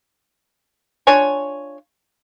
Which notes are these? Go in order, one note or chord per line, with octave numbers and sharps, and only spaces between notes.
D4 F4 C#5 G#5